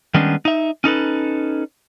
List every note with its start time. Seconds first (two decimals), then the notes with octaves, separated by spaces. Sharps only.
0.14 D#3 G3 G#3 B3 C#4 D4
0.45 D#4 E5
0.84 C#4 D#4 A4 B4